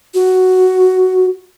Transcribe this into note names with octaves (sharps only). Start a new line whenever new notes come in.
F#4